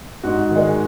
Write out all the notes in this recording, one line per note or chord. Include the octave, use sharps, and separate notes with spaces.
G#2 F#4
D#3 G#3